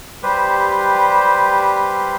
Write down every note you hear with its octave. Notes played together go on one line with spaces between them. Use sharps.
G3 G4 B4 C5